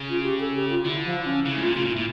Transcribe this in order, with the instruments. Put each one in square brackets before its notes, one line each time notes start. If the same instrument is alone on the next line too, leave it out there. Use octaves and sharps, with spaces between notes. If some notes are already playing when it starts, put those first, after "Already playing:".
Already playing: [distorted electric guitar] C#3
[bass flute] F4
G4
A4
G4
F4
[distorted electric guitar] D3 [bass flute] E4
[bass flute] F3
C#4
[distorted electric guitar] C#3 [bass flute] E4
[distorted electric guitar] A2
[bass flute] F4
[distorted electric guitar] A#2
[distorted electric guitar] C#3 [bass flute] F4
[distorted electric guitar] A#2
[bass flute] E4
[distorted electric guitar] A#2